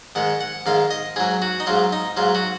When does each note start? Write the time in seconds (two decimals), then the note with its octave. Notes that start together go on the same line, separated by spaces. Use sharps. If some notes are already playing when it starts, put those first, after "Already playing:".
0.15 G#2 D#3 G#3 F#5
0.40 F#5
0.66 G#2 D#3 G#3 F5
0.91 D#5
1.16 G#2 F#3 G#4
1.42 F#4
1.60 D#4
1.66 G#2 F#3 F4
1.93 D#4
2.17 G#2 F#3 F4
2.35 F#4